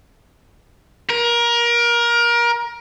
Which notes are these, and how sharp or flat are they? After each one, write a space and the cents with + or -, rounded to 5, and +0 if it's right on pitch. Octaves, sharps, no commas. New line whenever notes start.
A#4 +25